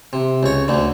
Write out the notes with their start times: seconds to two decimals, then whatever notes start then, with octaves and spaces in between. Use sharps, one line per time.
0.13 C3
0.43 C#2 C#5
0.68 D2 D3